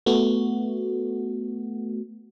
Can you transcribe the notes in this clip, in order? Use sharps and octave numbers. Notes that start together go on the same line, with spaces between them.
A3 B3 F#4